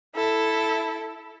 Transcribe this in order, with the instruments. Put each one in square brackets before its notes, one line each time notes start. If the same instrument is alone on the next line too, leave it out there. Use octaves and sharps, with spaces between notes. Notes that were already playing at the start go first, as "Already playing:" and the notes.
[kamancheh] E4 A4